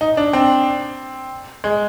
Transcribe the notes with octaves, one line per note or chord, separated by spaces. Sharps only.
D#4
D4
C4
G#3